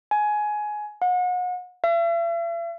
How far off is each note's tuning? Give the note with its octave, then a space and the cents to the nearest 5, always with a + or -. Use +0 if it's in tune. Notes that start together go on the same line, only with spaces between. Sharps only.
G#5 +15
F#5 -35
E5 +45